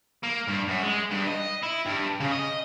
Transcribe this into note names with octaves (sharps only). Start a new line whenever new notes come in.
A#3
G2
F#2
G#3
G2
D#5
E4
G2
C#3
D#5